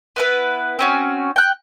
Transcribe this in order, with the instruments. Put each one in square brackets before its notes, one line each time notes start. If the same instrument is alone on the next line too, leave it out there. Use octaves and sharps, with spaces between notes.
[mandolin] B3 E4 B4
C4 C#4 F#4
G5 F#6